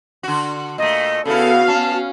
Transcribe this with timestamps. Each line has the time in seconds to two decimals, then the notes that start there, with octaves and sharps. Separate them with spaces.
0.23 D3 F#4
0.78 A#2 A3 D#5
1.25 C#3 B3 E4 F#4 A4 F5
1.68 C#4 A5